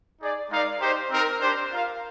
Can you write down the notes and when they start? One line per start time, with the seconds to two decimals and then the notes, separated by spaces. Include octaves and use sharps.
0.21 D#4 G#4 D5
0.51 G#3 D#4 A#4 D5 F5
0.81 D#4 G4 C5
1.11 C4 D#4 A#4
1.41 D4 G4 C5
1.72 F4 A#4 F5